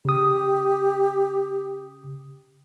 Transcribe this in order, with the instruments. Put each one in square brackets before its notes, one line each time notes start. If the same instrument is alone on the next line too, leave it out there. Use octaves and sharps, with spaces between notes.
[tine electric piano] C#3 D#6 [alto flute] G4